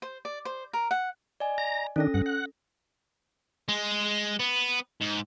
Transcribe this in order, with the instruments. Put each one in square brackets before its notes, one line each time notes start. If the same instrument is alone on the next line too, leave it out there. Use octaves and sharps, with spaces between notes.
[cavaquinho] C5
D5
C5
A#4
F#5
[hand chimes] D5 D#5 G#5
[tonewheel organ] A#5
[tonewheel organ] D#3 D4 [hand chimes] C#4 A4 A#6
[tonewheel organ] G2 F#5
F#5
[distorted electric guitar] G#3
B3
G#2